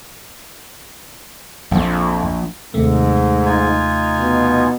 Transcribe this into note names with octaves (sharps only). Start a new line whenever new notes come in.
A#1 F2
D#2 G#2 C3 A3
D#4 F4 G#5
B2